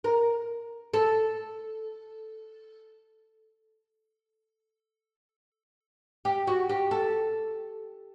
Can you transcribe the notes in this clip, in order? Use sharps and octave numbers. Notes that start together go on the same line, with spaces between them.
A#4
A4
G4
F#4
G4
A4